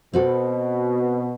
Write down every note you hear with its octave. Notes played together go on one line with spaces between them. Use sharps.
B2 C4 F#4 A4